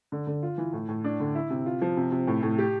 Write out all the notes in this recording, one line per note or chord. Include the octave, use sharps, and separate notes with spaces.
D3
D3
F4
E3
A2
A2
D4
D3
E4
C3
F4
F3
C3
C3
A2
A2
G4